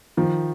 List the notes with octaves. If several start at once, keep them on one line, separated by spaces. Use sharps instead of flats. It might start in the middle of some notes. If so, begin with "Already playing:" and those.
D#3 F3